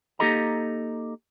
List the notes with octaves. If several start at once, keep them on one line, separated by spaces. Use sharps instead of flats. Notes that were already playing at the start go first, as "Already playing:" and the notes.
A#3 D#4 G4 A4 D#5 A#5